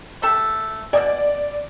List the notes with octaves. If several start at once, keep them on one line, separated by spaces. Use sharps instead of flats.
A3 G4 A4
B2 D5 D#5 G#5